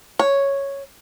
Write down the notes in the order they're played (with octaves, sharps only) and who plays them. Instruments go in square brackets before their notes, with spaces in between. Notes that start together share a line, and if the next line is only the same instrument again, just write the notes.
[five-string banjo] C#5